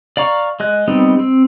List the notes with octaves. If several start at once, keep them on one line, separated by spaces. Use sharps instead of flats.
D5 F5 A#5 C#6
G#3 D#5 F#6
G3 B3 C4 D#4
C4